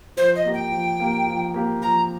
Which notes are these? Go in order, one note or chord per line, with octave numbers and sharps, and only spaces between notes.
F3 C5
D#5
A#3 G4
G5
F3
A#3 G4
F3
A#3 G4
F3 A#5